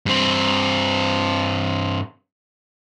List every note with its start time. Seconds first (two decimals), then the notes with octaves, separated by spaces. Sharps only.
0.06 G2 C4